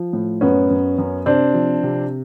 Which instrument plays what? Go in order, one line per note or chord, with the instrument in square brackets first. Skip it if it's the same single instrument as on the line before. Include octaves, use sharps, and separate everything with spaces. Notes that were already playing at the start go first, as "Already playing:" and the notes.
Already playing: [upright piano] F3
A2
F#2 B3 C#4
F#2
F#2
C3 C4 D4
F3
C3